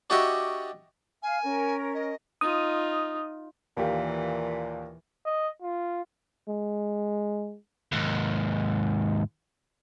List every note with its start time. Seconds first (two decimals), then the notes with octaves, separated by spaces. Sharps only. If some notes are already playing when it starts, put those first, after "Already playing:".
0.10 D4 F#4 G4 D#5 E5 C#6
1.23 F5 G#5 F6
1.44 C#4 A#4
1.94 D#5
2.41 D#4 F4 D#6
3.77 D#2 A#2 E3 A#3 G4
5.25 D#5
5.62 F4
6.48 G#3
7.92 D#2 G#2